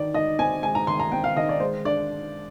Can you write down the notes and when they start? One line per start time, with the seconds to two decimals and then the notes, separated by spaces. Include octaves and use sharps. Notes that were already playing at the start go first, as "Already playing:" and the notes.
Already playing: D#3 D#4 D5
0.14 D#4 D#5
0.39 C4 G#5
0.63 G#3 G#5
0.75 A#5
0.87 D#3 C6
1.00 A#5
1.12 C4 G5
1.24 F5
1.36 D#3 D#5
1.49 D5
1.60 G#3 C5
1.85 D4 D5